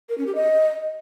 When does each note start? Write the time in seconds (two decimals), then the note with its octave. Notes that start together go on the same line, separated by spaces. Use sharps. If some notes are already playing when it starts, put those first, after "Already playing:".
0.09 A#4
0.18 C#4
0.27 G4
0.35 D#5